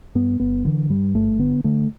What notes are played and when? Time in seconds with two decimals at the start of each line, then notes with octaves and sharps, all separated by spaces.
0.15 G2 B3
0.40 G1 B3
0.65 D3 E3
0.90 G2 G3
1.14 G1 A3
1.39 D3 B3
1.64 D3 A3